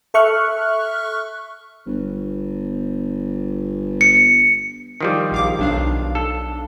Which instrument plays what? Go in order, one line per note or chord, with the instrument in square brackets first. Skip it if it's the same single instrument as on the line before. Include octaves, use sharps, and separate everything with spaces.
[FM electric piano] A4 E5 C#6 F6 F#6
[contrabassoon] G1
[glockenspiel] C#7
[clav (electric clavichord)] D#3 F3 G3
[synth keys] A#1 F5 D6
B1 D4 F5
[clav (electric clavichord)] A4